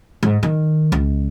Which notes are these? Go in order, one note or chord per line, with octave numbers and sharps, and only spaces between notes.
G#2
D#3
C#2